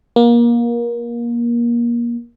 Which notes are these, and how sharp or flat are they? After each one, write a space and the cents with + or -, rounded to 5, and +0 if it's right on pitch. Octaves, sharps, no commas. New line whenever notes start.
A#3 +25